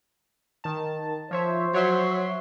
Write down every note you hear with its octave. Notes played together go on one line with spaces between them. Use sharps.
D#3 A5
F3 C5 C#5 E5
F#3 C#5 E5 C6